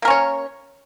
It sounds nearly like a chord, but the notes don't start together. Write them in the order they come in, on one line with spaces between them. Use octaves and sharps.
A#3 A#4 C#4 C#5